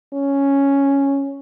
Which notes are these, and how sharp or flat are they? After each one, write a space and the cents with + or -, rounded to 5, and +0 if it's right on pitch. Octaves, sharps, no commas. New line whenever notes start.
C#4 +0